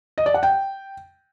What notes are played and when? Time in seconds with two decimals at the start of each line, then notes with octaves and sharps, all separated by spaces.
0.18 D#5
0.26 D5
0.34 F#5
0.43 G5